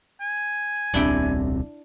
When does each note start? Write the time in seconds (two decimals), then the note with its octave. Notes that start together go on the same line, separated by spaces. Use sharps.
0.21 G#5
0.94 D#1 C2 C3 D4 E4 G5